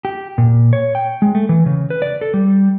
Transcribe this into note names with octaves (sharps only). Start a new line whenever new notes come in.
G4
A#2
C#5
G5
G#3
A3
E3
C#3
B4
D5
A4
G3